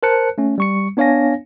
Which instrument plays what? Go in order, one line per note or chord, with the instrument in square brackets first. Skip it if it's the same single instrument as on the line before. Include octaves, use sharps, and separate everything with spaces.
[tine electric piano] A#4 C5 A5 F#6 C#7
A3 C#4
G3 C#6 C#7
B3 D4 C#5 F5 G#5 A#6